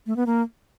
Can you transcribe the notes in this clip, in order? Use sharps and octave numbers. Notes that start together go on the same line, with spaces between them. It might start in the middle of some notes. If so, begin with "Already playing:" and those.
A3
B3
A#3